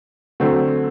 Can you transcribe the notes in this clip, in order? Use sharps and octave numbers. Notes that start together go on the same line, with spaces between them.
D3 F#3 A3 C4